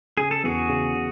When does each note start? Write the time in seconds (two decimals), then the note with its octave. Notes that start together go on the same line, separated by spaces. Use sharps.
0.17 C#3 G#4
0.31 A4
0.44 E2 F#4 G#4
0.69 C#3
0.95 C#3